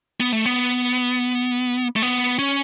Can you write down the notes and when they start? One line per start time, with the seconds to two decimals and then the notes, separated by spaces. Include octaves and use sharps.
0.20 B3
0.33 A3
0.45 B3
1.96 A3
2.02 B3
2.39 C#4